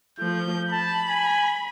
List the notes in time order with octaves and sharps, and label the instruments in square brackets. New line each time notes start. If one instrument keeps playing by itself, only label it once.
[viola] F3 A3 [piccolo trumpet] G6
[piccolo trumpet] A5 [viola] B5
[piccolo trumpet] G#5